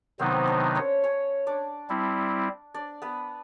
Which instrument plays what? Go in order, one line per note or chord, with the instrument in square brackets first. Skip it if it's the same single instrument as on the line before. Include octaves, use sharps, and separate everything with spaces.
[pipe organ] C3 D#3 F#3 B3 D#4 [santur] C4 C5
[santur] D4 D5
C#4 C#5
C#4 C#5
D4 D5
[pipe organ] G3 C4 E4
[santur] D4 D5
B3 B4